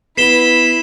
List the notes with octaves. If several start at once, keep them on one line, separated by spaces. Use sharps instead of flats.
B3 E4 B6 C7 E7 G7